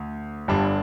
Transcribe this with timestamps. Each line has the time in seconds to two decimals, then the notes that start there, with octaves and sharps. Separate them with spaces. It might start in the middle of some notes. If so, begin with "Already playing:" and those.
Already playing: D2
0.48 G1 G2 D3 G3 D4